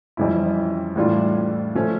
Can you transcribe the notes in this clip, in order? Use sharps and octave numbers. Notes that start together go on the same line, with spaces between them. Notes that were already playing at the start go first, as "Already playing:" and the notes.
F2 E3 G3 C#4 E4
A2 E3 G3 D4 F4
F3 A3 C#4